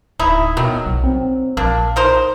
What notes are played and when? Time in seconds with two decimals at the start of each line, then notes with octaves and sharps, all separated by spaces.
0.19 D1 D#4 E4
0.57 B2 D#3 F#3
0.86 B1
1.04 C4
1.57 A#1 A#3 D4
1.96 D#4 A#4 C5